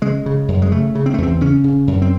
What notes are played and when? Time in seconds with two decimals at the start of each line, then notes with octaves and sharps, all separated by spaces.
0.02 C#3 G#3
0.26 C#3
0.48 F#2
0.62 G#3
0.71 C#3 A3
0.95 C#3
1.06 C4
1.14 A3
1.18 E2 C4
1.41 C#3 C#4
1.64 C#3
1.87 F#2
2.02 C4